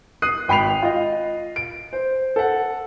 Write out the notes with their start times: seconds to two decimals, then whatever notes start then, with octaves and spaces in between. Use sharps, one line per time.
0.22 D#6 F#6 C7 D#7
0.48 G#1 G5 B5 C7 F7
0.82 F4 D#5
1.56 D7
1.93 C5
2.36 A4 F#5